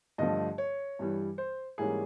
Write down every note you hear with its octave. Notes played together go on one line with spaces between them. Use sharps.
G2 D3 F3 A3 D#5
C#5
G2 E3 G3
C5
G#2 E3 G3 A#3 C#4 G#4